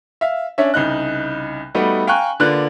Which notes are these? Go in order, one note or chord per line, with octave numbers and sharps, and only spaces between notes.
E5 F5
C#4 D4 C#5 E5
C2 C#3 D#4 F#6
G3 A3 B3 D#4 F#4 A4
F5 G5 G#5 A#5 C#6 F#6
D3 A#3 F4 B4 D5 F#6